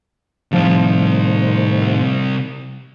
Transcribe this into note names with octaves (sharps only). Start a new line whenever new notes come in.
A2 C3 D#3 F3 G3 C4 A5